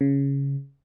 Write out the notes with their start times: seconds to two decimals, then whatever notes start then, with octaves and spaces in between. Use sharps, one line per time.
0.01 C#3